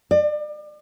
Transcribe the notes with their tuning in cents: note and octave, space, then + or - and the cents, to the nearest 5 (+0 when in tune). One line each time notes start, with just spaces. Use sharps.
D5 +35